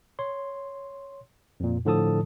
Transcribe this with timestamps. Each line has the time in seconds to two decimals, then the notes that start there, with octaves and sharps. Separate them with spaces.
0.19 C#5 C6
1.60 F2 A#2
1.85 A2 D3 F3 A4 A5 D#6